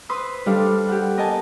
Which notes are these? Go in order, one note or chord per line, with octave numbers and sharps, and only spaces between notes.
B4 C5 B5 C6 D#6 E6
G3 D4 A4 F5
G4 F#5
B3 A#4 D#5 G#5 A5